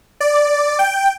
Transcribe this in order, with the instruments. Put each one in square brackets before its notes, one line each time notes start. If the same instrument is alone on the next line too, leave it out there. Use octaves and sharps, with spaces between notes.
[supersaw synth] D5
G5